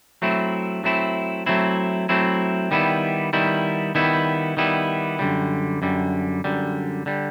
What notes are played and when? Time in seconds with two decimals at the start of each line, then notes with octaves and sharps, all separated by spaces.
0.22 F#3 A3 C4 E4
0.84 F#3 A3 C4 E4
1.46 F#3 A3 C4 E4
2.09 F#3 A3 C4 E4
2.71 D#3 G3 B3 E4
3.33 D#3 G3 B3 E4
3.95 D#3 G3 B3 E4
4.57 D#3 G3 B3 E4
5.19 F#2 D3 G3
5.82 F#2 D3 G3
6.44 F#2 D3 G3
7.06 D3 G3